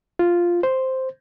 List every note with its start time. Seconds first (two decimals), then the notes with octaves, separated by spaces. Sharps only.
0.19 F4
0.63 C5